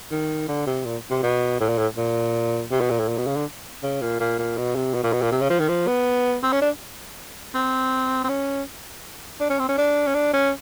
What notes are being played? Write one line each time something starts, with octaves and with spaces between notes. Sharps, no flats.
D#3
D3
C3
A#2
C3
B2
A2
A#2
A2
A#2
C3
B2
A#2
A2
A#2
B2
C#3
D3
C#3
A#2
A#2
A#2
B2
C3
B2
A#2
B2
A#2
C3
C#3
F3
D#3
F3
B3
C4
C#4
D4
C4
C4
C#4
D4
C#4
C4
C#4
D4
C#4
D4
C#4